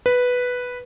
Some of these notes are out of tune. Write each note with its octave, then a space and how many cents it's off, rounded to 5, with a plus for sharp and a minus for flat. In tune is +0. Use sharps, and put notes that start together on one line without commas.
B4 +0